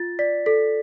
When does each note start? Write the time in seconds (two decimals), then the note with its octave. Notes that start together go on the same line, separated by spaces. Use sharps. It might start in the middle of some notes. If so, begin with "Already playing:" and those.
Already playing: F4 A6
0.19 D5 B6
0.46 A4 B6